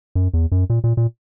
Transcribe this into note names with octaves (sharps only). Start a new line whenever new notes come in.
F#2
E2
F#2
A#2
A#2
A#2